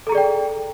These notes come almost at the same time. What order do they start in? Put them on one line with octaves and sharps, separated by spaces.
A4 A#5 G#4 D5 G5